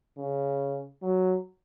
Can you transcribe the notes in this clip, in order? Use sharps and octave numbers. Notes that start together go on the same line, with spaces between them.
C#3
F#3